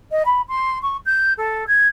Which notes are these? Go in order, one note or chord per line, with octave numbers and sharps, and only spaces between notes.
D#5
B5
C6
C#6
G6
A4
G#6